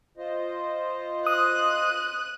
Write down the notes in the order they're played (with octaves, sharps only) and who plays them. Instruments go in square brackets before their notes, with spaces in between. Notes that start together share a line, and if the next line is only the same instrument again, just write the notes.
[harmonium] F4 C5 D#5
[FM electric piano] D#6 [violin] F#6 D#7